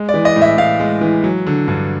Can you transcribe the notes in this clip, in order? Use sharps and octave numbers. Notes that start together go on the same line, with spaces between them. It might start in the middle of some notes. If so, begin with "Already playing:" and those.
Already playing: G#3
D5
E3
D#5
A2
E5
A2 F5
G#3
E3
F#3
D3
G2